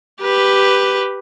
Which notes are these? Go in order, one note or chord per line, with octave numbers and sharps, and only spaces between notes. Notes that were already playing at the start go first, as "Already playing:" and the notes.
G4 B4